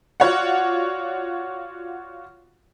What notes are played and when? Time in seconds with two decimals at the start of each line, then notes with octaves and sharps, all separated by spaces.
0.20 F4 F#4 C#5 D5 F#5